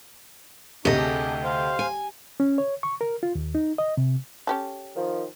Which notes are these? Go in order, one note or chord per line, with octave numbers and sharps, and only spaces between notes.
D2 C3 D#4 G4 A4 D#5 C#6
G#4 D6
C5 F5
G#5
C#4
C#5
C#6
A#4
F4
D#2
D#4
D#5
C3
C#4 G4 A4
D#3 F3